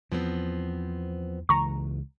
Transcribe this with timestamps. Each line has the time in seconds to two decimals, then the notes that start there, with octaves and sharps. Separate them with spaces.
0.12 E2 F3 B3 C4
1.49 C#2 E3 A#5 C#6